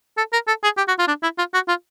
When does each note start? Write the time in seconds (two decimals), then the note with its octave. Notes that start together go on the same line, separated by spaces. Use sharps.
0.17 A4
0.33 A#4
0.48 A4
0.64 G#4
0.77 G4
0.88 F#4
0.99 F4
1.08 D4
1.23 E4
1.38 F4
1.54 F#4
1.68 F4